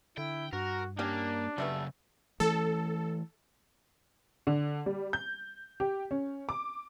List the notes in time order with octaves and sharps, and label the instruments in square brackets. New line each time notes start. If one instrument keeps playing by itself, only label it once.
[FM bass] D3 [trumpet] E4 [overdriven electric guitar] G5
[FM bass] G2 [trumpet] F#4 [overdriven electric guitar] A#4
[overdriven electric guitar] A#3 [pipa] C#4 G4 D5 [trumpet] D4
[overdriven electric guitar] C#3 F#3 [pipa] G3 A3 B3
[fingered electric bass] E3 A3 [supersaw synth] A4
[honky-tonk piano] D3
G3
G6
G4
C#4
D6